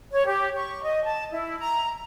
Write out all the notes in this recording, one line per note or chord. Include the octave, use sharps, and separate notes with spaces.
C#5
G4
C#6
D#5
A5
E4
A#5